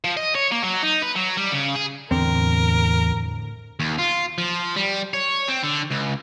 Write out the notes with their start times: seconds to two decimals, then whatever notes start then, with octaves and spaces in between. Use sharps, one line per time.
0.04 F3
0.17 D#5
0.35 C#5
0.52 A#3
0.64 F#3
0.83 D#4
1.02 B4
1.15 F#3
1.37 G3
1.52 C#3
1.75 G#4
2.11 E2 A2 D3 C4 A#4
3.80 D#2
3.98 F4
4.38 F3
4.76 G3
5.13 C#5
5.49 C4
5.64 D3
5.91 C#2